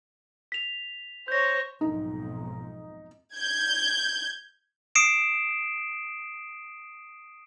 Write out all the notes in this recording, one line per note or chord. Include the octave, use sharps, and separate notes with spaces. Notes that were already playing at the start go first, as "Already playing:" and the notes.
B6 F7
C5 C#5 G6 A#6
B1 F2 G#2 D#4
G6 G#6
D#6 C7 D7 E7